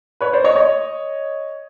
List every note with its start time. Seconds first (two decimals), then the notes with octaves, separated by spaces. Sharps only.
0.21 B4 C#5
0.33 C5 D5
0.44 C#5 D#5
0.56 C#5 D#5